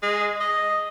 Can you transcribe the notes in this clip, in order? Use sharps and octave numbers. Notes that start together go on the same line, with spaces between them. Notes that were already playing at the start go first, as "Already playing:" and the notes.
G#3
D#5